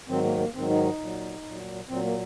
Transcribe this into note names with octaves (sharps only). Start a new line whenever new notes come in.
G#2 D#3 F#3 C4
A#3
A#3
G#2 D#3 F#3 C4
D#4
D#4
A#2 F#3
A#2 F#3
A#2 F#3 C4
A#3